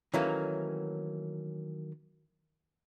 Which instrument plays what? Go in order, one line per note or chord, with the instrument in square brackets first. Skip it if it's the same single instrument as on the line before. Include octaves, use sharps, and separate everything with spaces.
[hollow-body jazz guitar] D#3 E3 F#3 A3 A#3 C#4